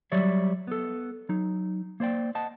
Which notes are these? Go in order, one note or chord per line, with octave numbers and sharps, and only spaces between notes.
F#3 G3 C#5 D5 E5
B3 A4
F#3 D#4
A#3 C5 D5 G5
C5 D#5 F#5 A5